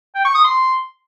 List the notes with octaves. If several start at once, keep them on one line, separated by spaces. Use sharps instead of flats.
G5
C#6
D#6
C6